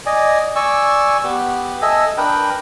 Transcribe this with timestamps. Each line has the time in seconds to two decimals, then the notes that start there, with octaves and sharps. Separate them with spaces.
0.06 D5 D#5 G#5
0.56 D5 G#5 C#6 E6
1.24 B3 G4
1.82 A4 D#5 E5 G#5
2.18 D4 A#4 B4 G5